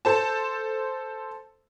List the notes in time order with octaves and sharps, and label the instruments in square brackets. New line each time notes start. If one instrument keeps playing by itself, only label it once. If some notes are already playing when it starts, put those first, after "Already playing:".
[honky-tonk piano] A4 C5 A5